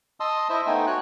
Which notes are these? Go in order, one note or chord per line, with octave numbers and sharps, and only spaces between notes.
D#5 A5 C6 D#6 E6
E4 C5 D#5 E5
A3 B3 D#4 G5 G#5
F#4 C#5 F#6